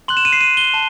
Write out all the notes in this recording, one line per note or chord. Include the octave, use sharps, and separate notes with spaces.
C6 F#6 F#7
E7
D#7
C7
D#7
G7
A5